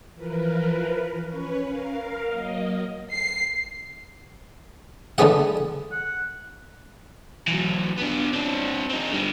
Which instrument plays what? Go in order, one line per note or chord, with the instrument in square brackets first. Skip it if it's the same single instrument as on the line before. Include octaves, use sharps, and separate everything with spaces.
[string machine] E3 F3 A#4 B4
C#4 B4 C#5
A#4 F5
F#3 A#3 D#5
[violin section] C7
[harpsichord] D3 A3 B3 G#4 F#5
[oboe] F#5
[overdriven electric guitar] E3 F#3
B3 D4
C4 D4
C4 D#4
D3 G3